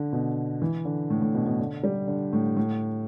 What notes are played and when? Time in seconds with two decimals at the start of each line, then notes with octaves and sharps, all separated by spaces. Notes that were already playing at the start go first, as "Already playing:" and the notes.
Already playing: D3
0.13 B2
0.62 E3
0.85 D3
1.10 A2
1.22 A2
1.34 B2
1.46 B2
1.59 D3
1.84 G3
2.07 D3
2.33 A2
2.57 A2